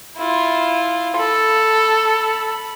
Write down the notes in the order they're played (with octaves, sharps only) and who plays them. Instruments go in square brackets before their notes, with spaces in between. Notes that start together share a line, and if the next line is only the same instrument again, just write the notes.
[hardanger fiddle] E4 F4
[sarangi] A4 [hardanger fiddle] B5